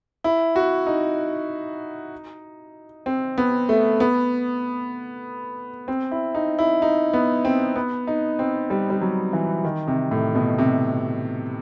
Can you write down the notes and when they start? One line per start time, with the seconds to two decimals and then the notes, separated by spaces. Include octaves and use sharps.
0.24 E4
0.56 F#4
0.87 D#4
3.06 C4
3.38 B3
3.69 A3
4.00 B3
5.88 C4
6.11 E4
6.35 D#4
6.59 E4
6.82 D#4
7.14 B3
7.45 C4
7.76 B3
8.07 D#4
8.39 C4
8.70 G3
8.90 G3
9.01 F#3
9.33 E3
9.65 D#3
9.88 C3
10.11 A2
10.35 B2
10.58 C3